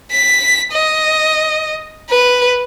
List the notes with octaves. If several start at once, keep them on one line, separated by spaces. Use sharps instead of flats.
B6
D#5
B4